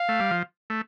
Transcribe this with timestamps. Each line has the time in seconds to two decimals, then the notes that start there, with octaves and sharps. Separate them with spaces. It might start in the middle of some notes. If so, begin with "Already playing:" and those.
Already playing: F5
0.09 A3
0.20 G3
0.31 F3
0.70 A3